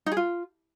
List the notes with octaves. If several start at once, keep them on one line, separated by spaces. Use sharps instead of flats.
D#4
G#4
F4